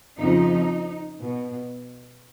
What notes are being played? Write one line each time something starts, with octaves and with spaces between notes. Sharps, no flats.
F2 C#3 F3 D#4
B2